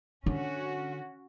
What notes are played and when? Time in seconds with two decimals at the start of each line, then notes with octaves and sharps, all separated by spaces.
0.26 D3 C#4 F#4